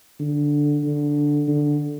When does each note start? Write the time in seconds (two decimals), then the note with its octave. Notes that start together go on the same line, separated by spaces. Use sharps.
0.20 D3
0.84 D3
1.48 D3